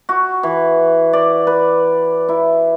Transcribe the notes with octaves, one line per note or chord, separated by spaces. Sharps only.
F#4
E3
D5
B4
E4